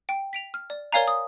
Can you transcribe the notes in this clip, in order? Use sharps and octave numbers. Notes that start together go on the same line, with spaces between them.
G5
B6 D7 F7
F6
D5
A#4 C#5 D5 F5 G#5 A#5
D#6